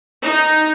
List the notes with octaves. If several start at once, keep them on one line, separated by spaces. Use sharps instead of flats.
D#4